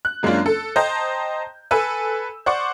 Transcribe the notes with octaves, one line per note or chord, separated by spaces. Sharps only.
F#6
F#2 G#3 A#3 C#4 D4 F4
A4
C5 D#5 G5 A5 A#5 G6
A4 B4 G#5 E6
C5 D5 F#5 C#6 D6